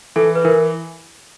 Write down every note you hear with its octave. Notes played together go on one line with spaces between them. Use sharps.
E3 A4
B4
E3 A#4